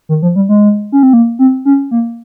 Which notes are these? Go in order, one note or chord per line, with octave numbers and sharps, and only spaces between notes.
D#3
F3
G3
G#3
C#4
C4
A#3
C4
C#4
A#3